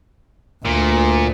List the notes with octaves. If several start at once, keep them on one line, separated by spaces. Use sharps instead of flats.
D2 A#2